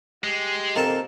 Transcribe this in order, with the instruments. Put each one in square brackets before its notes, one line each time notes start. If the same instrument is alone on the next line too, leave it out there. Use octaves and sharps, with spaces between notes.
[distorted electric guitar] G#3 [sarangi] G4
[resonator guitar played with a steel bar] A#2 A4 A#4 [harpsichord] D#3 C4 A5